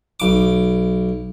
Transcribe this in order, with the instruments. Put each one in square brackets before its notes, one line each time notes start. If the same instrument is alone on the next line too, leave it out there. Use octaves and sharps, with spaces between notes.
[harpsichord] B1 D6